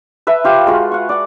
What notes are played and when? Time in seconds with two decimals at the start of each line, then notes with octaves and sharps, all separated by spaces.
0.27 B4 E5 A5
0.44 F4 G4 F5
0.67 G#3 F4 F#4
0.91 F#5 C#6
1.09 D5 F#5